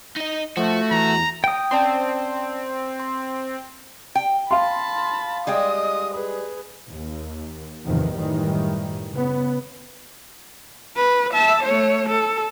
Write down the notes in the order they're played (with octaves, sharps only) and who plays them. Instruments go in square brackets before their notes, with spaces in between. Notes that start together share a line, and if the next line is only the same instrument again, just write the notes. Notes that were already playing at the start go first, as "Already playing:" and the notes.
[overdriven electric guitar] D#4 D#5
[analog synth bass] F3 [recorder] A3 [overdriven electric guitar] F#4
[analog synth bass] E2 [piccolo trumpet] A#5
[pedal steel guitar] G5 D#6
[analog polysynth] C4 [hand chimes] C#4 D5 A5
[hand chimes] C6
[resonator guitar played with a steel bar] G5
[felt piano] F5 C6 [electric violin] A5 B5
[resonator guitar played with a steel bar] G3 G#3 G5 [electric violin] D#5 D#6
[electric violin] G#4 B4
[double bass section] D#2
A1 E2 G#2 C3 D#3 F3
F#2 A2 D#3 E3 G3
C#3 B3
[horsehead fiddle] B4
E5 A5
A3 C#5
A4